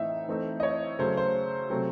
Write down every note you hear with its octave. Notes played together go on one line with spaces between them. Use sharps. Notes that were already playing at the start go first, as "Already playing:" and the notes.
Already playing: A2 E3 C4 D#4 E5
E3 A3 C4 D#4
D#5
C#5
C#3 F#3 A3 C#4 C5
C5
C3 F#3 A3 C4